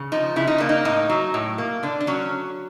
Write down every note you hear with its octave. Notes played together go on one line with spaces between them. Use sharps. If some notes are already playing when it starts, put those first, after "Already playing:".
Already playing: C#3
F3 D#4
C#3 E4
D#4
A#3 D4
D#4
A2 D#4
F#3
A2
A#3
D3 D4
D4
F#3 C#4